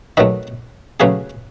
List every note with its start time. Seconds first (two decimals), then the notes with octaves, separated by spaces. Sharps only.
0.17 D#3 F#3 A3 B4 D#5
1.00 C#3 F#3 A3 C#4 G#4 B4